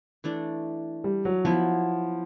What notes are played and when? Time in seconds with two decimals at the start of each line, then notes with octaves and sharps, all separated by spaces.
0.24 E3 A3 D4
1.04 G3
1.25 F#3
1.45 F3 F#3 B3 E4